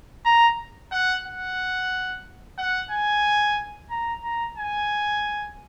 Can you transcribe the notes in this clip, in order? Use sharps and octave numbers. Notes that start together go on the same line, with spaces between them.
A#5
F#5
F#5
F#5
G#5
A#5
A#5
G#5